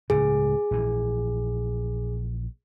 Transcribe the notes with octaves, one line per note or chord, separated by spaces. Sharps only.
C#2 A2 C#3 G#4
A#1 E3